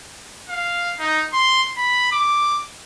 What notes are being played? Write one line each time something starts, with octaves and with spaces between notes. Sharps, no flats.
F5
D#4
C6
B5
D6